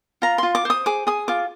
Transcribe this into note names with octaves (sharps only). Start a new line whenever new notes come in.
F4 A#5
F4 C6
D6
C5 D#6
G#4 D6
G#4 D#6
F4 D6